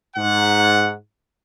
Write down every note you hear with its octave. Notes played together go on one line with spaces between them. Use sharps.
G#2 F#5